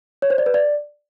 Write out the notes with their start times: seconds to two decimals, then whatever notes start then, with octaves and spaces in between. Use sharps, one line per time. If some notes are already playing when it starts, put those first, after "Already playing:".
0.22 C#5
0.30 C5
0.38 D5
0.46 B4
0.54 D5